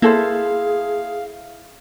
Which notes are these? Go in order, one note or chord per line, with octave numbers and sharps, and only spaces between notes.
A#3 E4 G#4 A4 C5 F5